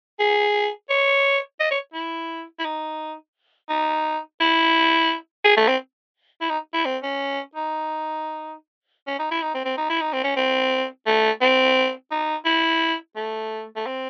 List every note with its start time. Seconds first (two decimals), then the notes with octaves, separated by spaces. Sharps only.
0.20 G#4
0.90 C#5
1.60 D#5
1.71 C#5
1.94 E4
2.59 E4
2.65 D#4
3.69 D#4
4.40 E4
5.44 G#4
5.57 A3
5.68 C4
6.41 E4
6.50 D#4
6.74 E4
6.85 C4
7.03 C#4
7.55 D#4
9.07 C#4
9.19 D#4
9.31 E4
9.42 D#4
9.55 C4
9.65 C4
9.77 D#4
9.90 E4
10.01 D#4
10.13 C4
10.24 C#4
10.36 C4
11.06 A3
11.41 C4
12.11 D#4
12.45 E4
13.16 A3
13.76 A3
13.86 C4